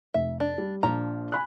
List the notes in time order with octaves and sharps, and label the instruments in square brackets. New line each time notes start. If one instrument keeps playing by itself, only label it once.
[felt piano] F1 [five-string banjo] E5
[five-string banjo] D4
[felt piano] G3
[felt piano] A#1 A#2 D4 [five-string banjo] F3 A#5
[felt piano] G#5 B5 F#6